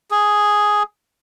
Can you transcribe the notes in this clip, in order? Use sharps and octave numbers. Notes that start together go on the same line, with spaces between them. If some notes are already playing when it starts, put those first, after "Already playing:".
G#4